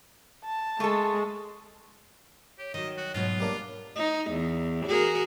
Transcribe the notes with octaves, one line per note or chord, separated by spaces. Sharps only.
A5
G#3 A3 A4
G4 C#5
D#3 F#3 D#5
F#4
G#2 B2 F#3 F4
G3 A#3 D4
D#4
E2
F#4 G#4 A#4